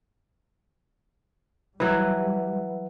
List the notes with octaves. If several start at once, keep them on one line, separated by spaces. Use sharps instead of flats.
E3 F#3 G3 B4 E5 F#5